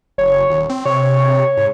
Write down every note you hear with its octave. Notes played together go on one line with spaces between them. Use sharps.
F#1 C#5
D#1
C4
C3 C#5
G#2